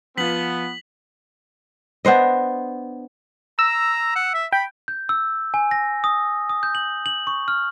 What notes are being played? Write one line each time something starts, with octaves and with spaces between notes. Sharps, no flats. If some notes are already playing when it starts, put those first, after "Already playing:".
F3 B3 F4 B6 F#7
B3 D4 C5 D#5
A#5 E6
F#5
E5
G5 B5
G6
E6
G#5
A#6
D#6
D#6
G6
F#7
F#7
C#6
F6